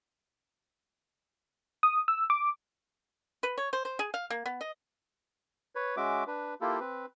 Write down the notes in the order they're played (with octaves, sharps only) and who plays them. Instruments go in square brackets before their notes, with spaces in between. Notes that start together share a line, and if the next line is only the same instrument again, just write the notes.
[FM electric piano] D#6
E6
D6
[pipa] B4
C#5
C5
C5
G#4
F5
A#3
B3
D#5
[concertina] B4 C#5
G#3 C#4 F#4 E5 D6
D4 B4
A#3 E4 F4 G4 A4
C4 B4